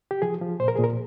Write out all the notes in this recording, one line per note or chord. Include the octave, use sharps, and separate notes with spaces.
G4
F3 G#4
F3
A#2 C5
A#4
G#4
A#2
A#4